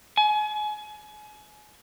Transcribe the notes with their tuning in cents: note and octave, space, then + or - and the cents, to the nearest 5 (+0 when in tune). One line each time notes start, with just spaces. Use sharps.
G#5 +35